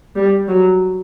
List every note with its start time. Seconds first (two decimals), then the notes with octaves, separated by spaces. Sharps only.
0.16 G3
0.48 F#3